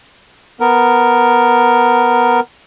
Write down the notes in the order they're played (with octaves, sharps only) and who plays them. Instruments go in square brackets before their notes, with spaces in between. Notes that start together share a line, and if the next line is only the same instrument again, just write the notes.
[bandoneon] B3 A#4